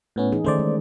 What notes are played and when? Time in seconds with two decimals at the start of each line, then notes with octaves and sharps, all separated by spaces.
0.16 A2 B3 C#4
0.32 E3 D#4 G#4
0.44 D#3 A3 C#4 C5 D5
0.59 G#3